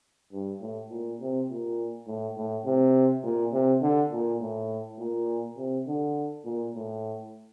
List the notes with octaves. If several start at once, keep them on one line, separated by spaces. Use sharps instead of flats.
G2
A2
A#2
C3
A#2
A2
A2
C3
A#2
C3
D3
A#2
A2
A#2
C3
D3
A#2
A2